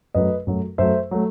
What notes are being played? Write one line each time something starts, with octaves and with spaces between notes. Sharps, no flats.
F#2 F#3 A3 B4 D#5
F#2 F#3 A3
F#2 F#3 A3 C5 E5
F#3 A3